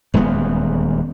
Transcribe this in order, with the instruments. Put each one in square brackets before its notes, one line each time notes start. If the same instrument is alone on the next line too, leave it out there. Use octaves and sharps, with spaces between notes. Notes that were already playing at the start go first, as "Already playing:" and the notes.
[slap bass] D#1 E2 G#3 B3